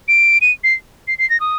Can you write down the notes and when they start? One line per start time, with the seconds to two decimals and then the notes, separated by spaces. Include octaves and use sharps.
0.08 D7
0.41 D#7
0.64 C7
1.08 C7
1.19 C7
1.30 A#6
1.40 D#6